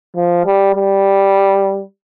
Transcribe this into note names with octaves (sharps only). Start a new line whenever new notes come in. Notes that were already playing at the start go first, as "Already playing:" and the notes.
F3
G3
G3